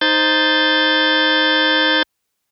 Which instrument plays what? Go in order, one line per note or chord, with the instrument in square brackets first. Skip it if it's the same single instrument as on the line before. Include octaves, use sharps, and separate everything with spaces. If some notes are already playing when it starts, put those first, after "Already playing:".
[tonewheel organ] D#4 C5 G6 A6